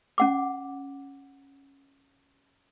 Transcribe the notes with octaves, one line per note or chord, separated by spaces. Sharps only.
C#4 F#5 D6